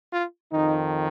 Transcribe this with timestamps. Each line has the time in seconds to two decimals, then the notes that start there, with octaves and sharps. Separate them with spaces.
0.12 F4
0.52 F2 D#3 D#4